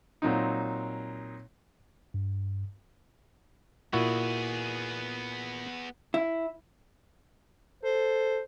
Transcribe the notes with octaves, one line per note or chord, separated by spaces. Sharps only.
A#2 F#3 C4 D#4
G2
A#2 B3 E4 F#4 G#4
E4
A4 C5